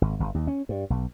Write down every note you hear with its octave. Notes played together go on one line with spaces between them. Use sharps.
G#1
G1
D#2
C#4
G2
B1